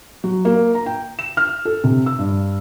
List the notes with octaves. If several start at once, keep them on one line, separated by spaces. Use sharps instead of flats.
F#3
A#3
A#5
G5
E7
F6
A4
C3
E6
G2